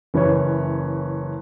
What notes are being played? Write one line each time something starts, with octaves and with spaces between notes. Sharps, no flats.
F#1 E3 C#4 B4 C#5